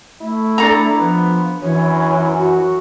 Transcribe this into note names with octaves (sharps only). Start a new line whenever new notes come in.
A3 E4
D4 A4 A#5
F3 B3
F#2 E3 C#5
F#4